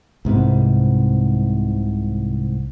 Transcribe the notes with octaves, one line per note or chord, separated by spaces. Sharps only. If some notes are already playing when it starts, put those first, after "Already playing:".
C2 G#2 C3 B3